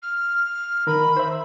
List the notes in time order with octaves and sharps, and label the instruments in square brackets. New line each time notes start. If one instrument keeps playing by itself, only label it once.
[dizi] F6
[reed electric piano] D#3 A#4 [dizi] B5
[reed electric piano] C5 E5